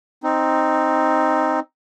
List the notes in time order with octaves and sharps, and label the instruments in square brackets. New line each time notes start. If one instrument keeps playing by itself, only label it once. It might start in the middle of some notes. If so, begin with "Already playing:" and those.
[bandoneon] C4 D#4